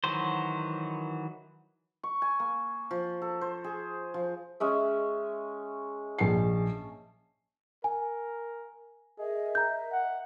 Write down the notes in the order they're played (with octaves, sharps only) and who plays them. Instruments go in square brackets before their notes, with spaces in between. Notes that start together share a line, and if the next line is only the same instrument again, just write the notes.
[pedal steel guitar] D#3 E3 F#3 F#4 C5
[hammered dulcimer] C#6
G#5
A#3
F3
A4
C5
G#4
F3
[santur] G#3 C#4 E5
[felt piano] A#1 C7 [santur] A5
[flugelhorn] A#4 [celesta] G#5
[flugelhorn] G#4 [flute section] A#4 D#5 E5
[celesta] A#5 G6
[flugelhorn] F#5